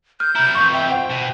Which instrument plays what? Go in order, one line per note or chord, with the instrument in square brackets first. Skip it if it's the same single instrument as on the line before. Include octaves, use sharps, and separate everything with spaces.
[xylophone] F6 [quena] G6
[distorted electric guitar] G3 E4 [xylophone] A#5
[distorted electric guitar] F2 E3 [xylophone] C6 C#6
[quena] E5 [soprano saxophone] G5
[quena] C5 [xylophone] F#5
[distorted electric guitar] B2